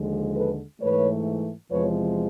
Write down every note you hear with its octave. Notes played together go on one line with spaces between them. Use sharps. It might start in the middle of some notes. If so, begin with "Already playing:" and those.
Already playing: D#2 D3 F3 G#3
A4 B4
G#2 E3 A3 B4 C#5
E2 C3 F3 G#3 B4 C#5